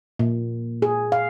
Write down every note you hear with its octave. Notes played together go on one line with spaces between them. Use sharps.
A#2
G#4
F5